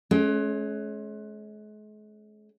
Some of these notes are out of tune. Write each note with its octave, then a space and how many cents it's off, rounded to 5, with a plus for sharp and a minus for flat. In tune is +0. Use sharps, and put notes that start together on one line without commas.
G#3 +40 C#4 +0